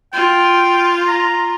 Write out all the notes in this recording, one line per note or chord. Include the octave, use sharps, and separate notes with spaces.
F4 G5
A#5